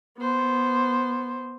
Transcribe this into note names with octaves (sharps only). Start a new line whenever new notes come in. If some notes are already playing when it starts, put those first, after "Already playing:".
B3 C5